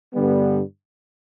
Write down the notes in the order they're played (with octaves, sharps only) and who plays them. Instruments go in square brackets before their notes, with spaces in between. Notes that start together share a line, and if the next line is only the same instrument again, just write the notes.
[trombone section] G2 D3 G3 B3